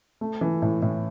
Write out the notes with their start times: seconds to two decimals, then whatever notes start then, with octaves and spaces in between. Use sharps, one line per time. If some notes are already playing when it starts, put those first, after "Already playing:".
0.21 A3
0.41 E3
0.62 A2
0.82 A2